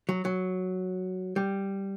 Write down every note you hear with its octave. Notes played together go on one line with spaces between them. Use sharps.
F#3
F#3
G3